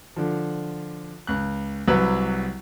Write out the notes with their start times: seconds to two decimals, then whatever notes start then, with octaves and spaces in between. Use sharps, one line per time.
0.16 D3 F3
1.27 C#2 F#6
1.88 C2 F#3 F#4 B4 F#5 E6